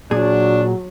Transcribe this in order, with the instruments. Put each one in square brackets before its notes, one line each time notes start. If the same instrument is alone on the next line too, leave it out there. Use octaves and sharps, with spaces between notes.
[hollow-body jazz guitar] A#2 G#4 [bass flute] F#3 [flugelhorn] D4